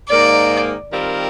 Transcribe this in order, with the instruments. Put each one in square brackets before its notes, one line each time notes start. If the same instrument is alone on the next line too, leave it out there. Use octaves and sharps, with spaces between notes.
[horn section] G#2 D#3 A#3 D#4 [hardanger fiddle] D5
[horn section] D#3 G3 C4 F4 A#4